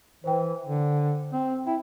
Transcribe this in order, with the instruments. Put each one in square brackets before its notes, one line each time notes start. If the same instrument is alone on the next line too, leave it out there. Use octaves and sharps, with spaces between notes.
[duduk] E3 [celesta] C5 G5
[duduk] D3
C4
[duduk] E4 [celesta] G5